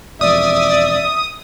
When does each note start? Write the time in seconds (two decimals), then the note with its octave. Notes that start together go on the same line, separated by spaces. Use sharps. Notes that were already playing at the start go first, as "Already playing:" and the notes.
0.21 E1 F2 D5 E5 D#6